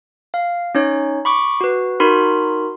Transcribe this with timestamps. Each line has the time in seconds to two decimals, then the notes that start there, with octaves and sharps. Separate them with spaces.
0.34 F5
0.75 C#4 D#4 C#5
1.25 B5 C#6 D6
1.61 F#4 B4
2.00 D#4 F#4 A#4 B5 C6